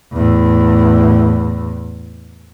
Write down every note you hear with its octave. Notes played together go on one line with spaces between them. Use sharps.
E2 A2